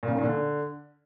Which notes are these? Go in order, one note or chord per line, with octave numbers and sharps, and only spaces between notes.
A#2
C#3
D#3
A#2
D3